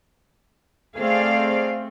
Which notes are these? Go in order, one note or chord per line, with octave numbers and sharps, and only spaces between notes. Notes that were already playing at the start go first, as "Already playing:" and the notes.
A3 C4 G#4 D5 F5